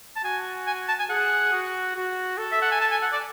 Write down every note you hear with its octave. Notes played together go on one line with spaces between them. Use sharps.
A5
F#4 G#5
G#5
A5
G#5
G#4 F#5
F#4
F#4
A4
E5
F#5
G#5
A5
G#5
F#5
D5